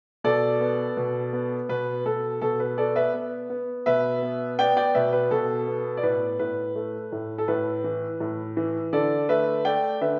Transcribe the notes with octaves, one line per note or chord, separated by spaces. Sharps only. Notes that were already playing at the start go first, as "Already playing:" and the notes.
B2 A4 D5
B3
B2
B3
B2 B4
B2 A4
B2 A4
B4
B3 A4 D5
B4 E5
B3
B3
B2 B4 E5
B3
B3 D5 G5
D5 G5
B2 B4 E5
B4
B2 A4
B3
D5
A2 B4
A2 B4
A3
A2
A4
A2 B4
E3
A2
E3
D3 A4 D5
A3 B4 E5
A3 D5 G5
D3 B4 E5